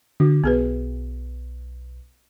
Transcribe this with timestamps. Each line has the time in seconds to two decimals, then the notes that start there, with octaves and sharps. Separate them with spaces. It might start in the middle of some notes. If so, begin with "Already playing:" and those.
0.20 D3 F#4
0.44 B1 B3 G#4 B4